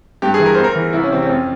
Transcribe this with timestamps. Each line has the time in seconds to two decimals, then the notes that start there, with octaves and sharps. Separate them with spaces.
0.22 G2 G4
0.34 G#4
0.39 E3
0.46 A#4
0.55 E2 C5
0.64 A#4
0.75 E3
0.93 C2 E4
1.03 C#4
1.11 C3 E3 C4
1.22 C#4
1.29 F2